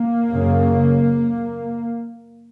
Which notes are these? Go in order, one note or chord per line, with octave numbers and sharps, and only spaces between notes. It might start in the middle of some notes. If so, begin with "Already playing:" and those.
Already playing: A#3
F#2 C#3